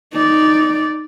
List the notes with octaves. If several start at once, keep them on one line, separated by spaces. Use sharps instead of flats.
D#4 D5